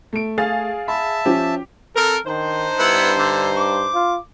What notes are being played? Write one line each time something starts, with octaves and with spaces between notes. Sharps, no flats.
A3 D7
G#4 F5 A6
E5 A5 B5
F3 C#4 G4
C4 A4 A#4
D#3 D4 D#4 C5
G2 B3 E4 F#5
D3
D6
F4